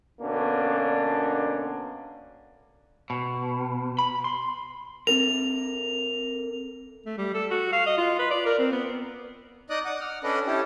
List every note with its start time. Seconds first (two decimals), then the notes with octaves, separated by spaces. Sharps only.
0.21 B2 D3 A#3 C#4 D4
3.10 B2
3.99 B5
4.24 C6
5.07 C4 A4 A#4 F7
7.06 A3
7.18 G3
7.34 A4
7.51 F#4
7.73 F5
7.86 D#5
7.98 F4
8.19 B4
8.31 D5
8.46 A#4
8.59 C4
8.72 B3
9.70 D#4 D5 D#5 D#6 F#6
9.85 F#5 D6 D#6
10.01 F#5 F6
10.23 C#4 D4 A4 B4 D5 D#5
10.47 C#4 E4 G4 A4